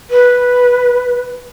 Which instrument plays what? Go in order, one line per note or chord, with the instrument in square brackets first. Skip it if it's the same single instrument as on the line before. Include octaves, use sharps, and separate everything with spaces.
[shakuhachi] B4